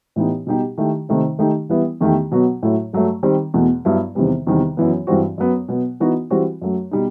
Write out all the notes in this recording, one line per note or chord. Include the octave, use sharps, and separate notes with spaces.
A2 E3 B3 D#4 G4
B2 G3 D#4 G4
D#3 A3 E4 G4
C3 D#3 A3 D#4
D#3 A3 D#4 G4
E3 G3 B3 E4
E2 D#3 A3 E4 G4
B2 F#3 B3 F#4
A2 F#3 A3 E4
G2 F#3 A3
D#3 G3 C4
E2 B2 A3
G2 F#3 B3 E4
E2 C3 D#3 G3 B3
E2 C3 D#3 G3
F#2 E3 B3
G2 E3 G3 C4 F#4
F#2 F#3 B3
B2 F#3 B3
E3 B3 D#4 F#4
E3 G3 C4 F#4
F#2 F#3 A3
B2 G3 D#4